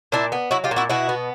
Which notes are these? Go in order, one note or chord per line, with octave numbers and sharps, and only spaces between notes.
A#2 D4 E4
B3
F#3 E4 F#4
F4 G4
A#2
E4 F#4
B2 E4 F#4
B3